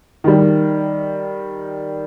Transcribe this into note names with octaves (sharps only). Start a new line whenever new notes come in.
D#3 G3